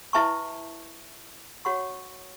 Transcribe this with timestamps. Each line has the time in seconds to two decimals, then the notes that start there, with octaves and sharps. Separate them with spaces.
0.13 E4 B4 E5 A5 C#6
1.65 F#4 C#5 F#5 C#6